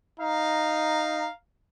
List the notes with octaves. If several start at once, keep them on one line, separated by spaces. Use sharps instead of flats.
D#4 F5 A#5